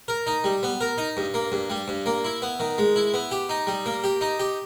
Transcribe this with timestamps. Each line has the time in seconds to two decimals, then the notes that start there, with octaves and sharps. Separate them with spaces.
0.08 A#4
0.27 D#4
0.44 G3
0.63 B3
0.81 A#4
0.98 D#4
1.17 G2
1.34 A#3
1.52 G2
1.70 G3
1.88 G2
2.06 A#3
2.24 E4
2.42 B3
2.60 D#3
2.78 G#3
2.96 E4
3.14 B3
3.31 G4
3.49 D#4
3.67 G3
3.86 A#3
4.04 G4
4.21 D#4
4.40 G4